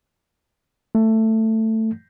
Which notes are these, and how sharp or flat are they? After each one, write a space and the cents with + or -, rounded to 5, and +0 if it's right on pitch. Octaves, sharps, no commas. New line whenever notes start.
A3 +10